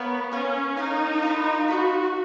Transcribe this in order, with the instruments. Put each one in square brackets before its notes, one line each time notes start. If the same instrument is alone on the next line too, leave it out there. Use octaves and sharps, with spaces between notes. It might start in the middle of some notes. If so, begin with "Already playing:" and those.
Already playing: [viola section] B3 [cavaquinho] A#4 C#5 F5
[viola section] C#4 [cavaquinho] A#4 C#5 F5
[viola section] D#4 [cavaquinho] A#4 C#5 F5
[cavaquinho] F4 A#4 F5 B5
[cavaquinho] F4 A#4 F5 B5 [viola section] F#4